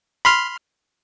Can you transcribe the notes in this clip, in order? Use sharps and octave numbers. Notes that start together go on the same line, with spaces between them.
B5 C6 F6